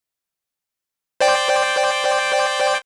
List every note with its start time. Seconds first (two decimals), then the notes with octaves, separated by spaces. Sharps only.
1.21 C5 D5 G5